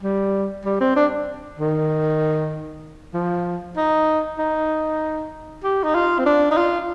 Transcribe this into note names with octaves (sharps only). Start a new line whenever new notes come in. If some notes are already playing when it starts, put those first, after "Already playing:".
G3
G3
C4
D4
D#3
F3
D#4
D#4
G4
D#4
F4
C4
D4
D#4
F4